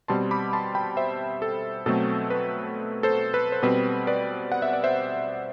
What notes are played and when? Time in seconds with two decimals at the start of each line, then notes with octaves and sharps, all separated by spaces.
0.08 B2 G3 C4 A5 C6
0.31 B5 D6
0.53 A5 C6
0.75 G5 B5
0.97 C5 E5
1.42 A4
1.86 B2 F#3 A3 C4 A4
2.30 B4
3.03 A4 C5
3.34 B4
3.52 C5
3.63 B2 G3 C4 B4
4.07 B4 D5
4.52 F#5
4.62 E5
4.73 D5
4.84 C5 E5